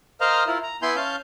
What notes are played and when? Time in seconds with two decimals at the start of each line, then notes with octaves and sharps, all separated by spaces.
0.21 A#4 C5 D#5 F5 A#5
0.47 E4 F4 A#4
0.63 A#5
0.82 B3 E4 G#5 B5 C6 G6
0.96 C#4 F5 A5 G6